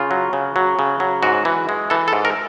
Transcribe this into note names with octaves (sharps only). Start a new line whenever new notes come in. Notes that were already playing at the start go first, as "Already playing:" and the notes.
Already playing: C#3 F4
F#3
C#3
F#3
C#3
F#3
G#2 F#4
E3
G#3
E3 A4
A4
G#2
A#4